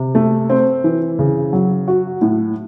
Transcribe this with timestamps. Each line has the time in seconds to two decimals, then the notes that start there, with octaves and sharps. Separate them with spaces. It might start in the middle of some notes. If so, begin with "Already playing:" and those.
Already playing: C3
0.15 A3
0.50 C4
0.84 E3
1.19 C#3
1.53 F#3
1.88 F#4
2.21 A2